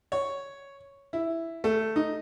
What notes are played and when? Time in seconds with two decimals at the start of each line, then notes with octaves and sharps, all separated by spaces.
0.12 C#5
1.13 E4
1.64 A3
1.96 D#4